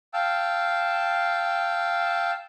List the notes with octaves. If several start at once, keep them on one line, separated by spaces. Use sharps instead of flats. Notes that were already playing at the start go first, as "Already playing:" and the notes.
F5 G5 A5 E6